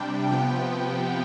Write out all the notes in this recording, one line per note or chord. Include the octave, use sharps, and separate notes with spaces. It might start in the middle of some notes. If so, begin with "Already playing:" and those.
Already playing: C3 G3 D4 G5
C3 F3 B3 G5